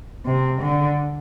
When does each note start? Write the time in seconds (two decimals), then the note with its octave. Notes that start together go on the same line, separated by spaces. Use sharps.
0.25 C3
0.61 D3